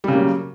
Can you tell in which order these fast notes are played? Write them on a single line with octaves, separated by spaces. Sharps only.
G3 C#3 A#3 F#3